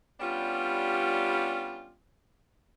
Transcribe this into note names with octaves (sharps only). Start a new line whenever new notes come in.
G3 B3 C#4 D4 F4 G4